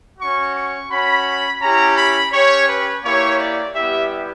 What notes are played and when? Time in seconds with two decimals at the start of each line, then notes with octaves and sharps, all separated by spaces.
0.19 C#4 F#4 C#6
0.55 C#6
0.90 C#4 F#4 B5
1.61 C#4 E4 G4 A#5
1.96 B5
2.32 C#4 G4 C#5
2.67 B4
3.04 A#3 E4 G4 C#5
3.38 D5
3.74 G3 B3 E4 G4 E5